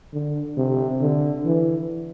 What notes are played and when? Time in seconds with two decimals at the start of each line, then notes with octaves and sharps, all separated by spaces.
0.13 D3
0.57 C3
1.01 D3
1.45 E3